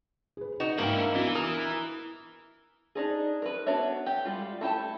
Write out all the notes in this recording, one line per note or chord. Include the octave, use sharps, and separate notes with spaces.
G#4 B4
D#4 F#4 B4
G#2 A#3 D#4 E4 A#4 G5
D4
E3 B3 D4 F#4
A#4 D#6 F6
D4 D#4 G#4
A#4 B4
B3 D4 F#4 C#5 E5
G4
G3 G#3 F4
A3 E4 G4 A5